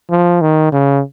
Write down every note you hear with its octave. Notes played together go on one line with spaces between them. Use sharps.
F3
D#3
C#3